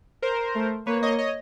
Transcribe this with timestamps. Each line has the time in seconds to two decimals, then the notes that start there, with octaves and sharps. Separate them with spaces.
0.22 A#4 C5
0.55 A3
0.87 A#3 B4 C#5
1.03 C#5 D#5
1.19 C#5 D#5